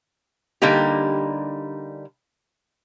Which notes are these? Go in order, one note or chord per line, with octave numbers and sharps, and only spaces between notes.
D3 G3 A#3 D#4 G4